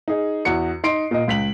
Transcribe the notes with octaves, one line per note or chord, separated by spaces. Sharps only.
D#4 G#4
E2 F#4 C#7
D#4 C6 C7 D7
A#2 D#5
C#2 B6 F#7